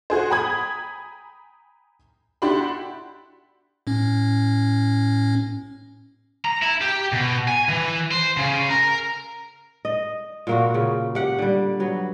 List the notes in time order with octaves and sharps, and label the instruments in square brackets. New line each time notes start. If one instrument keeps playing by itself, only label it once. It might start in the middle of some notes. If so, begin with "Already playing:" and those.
[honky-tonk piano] F#4 G#4 C5
G5 G#5 A#5 B5 D#6 G#6
D4 E4 F#4 G4 B5 C6
[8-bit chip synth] A2 C#4
[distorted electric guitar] A#5
E4
G4
B2
G#5
E3
C5
C#3
A#4
[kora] D#5
A#2 A#3 F#4
C#3
G4 F#5
D3 G3
F#3 B3